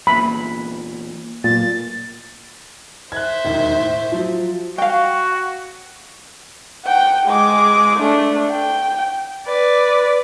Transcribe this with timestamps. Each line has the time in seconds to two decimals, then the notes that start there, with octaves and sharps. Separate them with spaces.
0.07 E2 A#2 B5
1.44 B1 A#2 A6
3.12 C5 E5 F#6 G#6
3.45 E1 D#2 D#3
3.79 A2
4.12 F3 F#3
4.78 F#4 F5 G5
6.86 F#5 G5
7.27 G#3 D6
7.99 A3 D4
8.52 G5
9.46 B4 D5